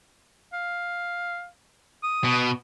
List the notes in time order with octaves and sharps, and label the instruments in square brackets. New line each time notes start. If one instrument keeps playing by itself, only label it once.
[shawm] F5
D#6
[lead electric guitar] B2